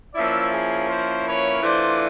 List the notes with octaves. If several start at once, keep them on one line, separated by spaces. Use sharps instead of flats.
F3 A#3 C#4 E4 D5 E5
G#4 A#4
A#4 C5
B4 C#5
E3 A3 D4 F4 C5 D5